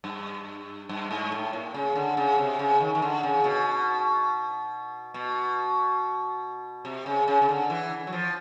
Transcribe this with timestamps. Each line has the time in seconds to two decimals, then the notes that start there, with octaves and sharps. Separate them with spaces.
0.04 G2
0.89 G2
1.11 G#2
1.32 A2
1.53 A#2
1.74 C#3
1.96 D3
2.17 C#3
2.38 C3
2.59 C#3
2.81 D#3
2.95 D#3
3.02 D3
3.23 C#3
3.44 B2
5.14 B2
6.85 C3
7.06 C#3
7.28 C#3
7.42 C#3
7.49 D3
7.70 E3
8.07 F#3
8.13 F3